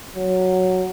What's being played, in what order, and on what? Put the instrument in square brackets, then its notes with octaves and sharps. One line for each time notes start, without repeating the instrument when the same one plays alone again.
[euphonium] F#3